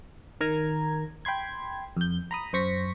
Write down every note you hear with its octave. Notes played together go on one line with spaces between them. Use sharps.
D#3 A#4 A#5 G#6
G5 B5 C6 G#6
F2 G6
A#5 B5 D#6
F#2 C5 C#6 A#6 B6